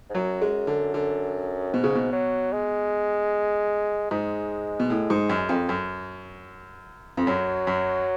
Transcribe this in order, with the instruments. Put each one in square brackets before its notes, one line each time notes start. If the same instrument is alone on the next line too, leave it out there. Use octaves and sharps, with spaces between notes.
[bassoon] G#2
[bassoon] F#2 [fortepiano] F#3
[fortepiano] G#3
D3
D3
[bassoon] G#2 [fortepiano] B2
[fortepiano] C#3
B2
[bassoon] F#3
G#3
[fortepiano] G#2 [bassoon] G#3
[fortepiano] B2
A2
G#2
F#2
F2
F#2
F2
[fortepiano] F#2 [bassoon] F#3
[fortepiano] F#2